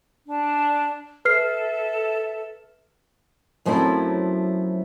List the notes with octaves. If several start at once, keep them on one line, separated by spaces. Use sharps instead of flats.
D4 A5
A4 B4 E5 F6 C7
F#2 F3 F#3 A3 C4 E4